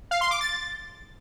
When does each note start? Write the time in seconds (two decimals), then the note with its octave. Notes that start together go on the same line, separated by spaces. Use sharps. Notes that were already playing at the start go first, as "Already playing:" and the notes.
0.11 F5
0.21 C6
0.31 D6
0.41 A6